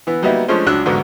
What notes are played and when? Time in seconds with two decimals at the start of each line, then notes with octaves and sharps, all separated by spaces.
0.07 E3 B3
0.22 F#3 G3 A#3 B3 D#4 E4
0.48 F3 G#3 A3 C#4 D4 C5
0.66 C#2 F#3 D4 E6 F#6
0.86 A1 G#2 D3 F#3 B3 F#4